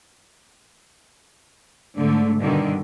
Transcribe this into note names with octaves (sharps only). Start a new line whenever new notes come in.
G#2 D3 A3
G2 B2 D3 D#3